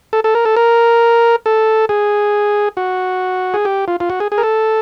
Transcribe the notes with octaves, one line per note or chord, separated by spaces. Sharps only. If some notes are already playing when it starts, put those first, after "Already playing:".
A4
A4
A#4
A4
A#4
A4
G#4
F#4
G#4
G4
F4
F4
F#4
G#4
G#4
A#4
A4